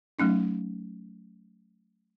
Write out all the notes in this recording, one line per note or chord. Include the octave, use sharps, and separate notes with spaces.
F#3 A3 C#4 D#4